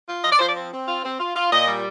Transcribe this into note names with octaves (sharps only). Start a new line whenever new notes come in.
F4
F3 D#5
D5
F3 C5
D5
C4
C4
F4
C4
F4
F4
A#2 D#5
G3